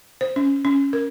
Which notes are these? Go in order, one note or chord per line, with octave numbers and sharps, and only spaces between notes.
C5
C#4
C#4
A#4